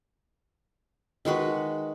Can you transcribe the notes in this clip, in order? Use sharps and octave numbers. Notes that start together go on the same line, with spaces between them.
D#3 G#3 F#4 B4